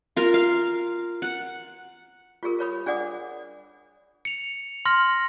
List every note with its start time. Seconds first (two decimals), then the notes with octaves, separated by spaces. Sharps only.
0.16 F4 A#4
0.34 F5
1.22 F#5
2.43 F4 G4 G#4 A#4
2.59 A#4 C#5 B5 D#6
2.86 D4 G#4 D5 F#5 D6 D#6
4.25 C#7 F7
4.85 C6 F6 A#6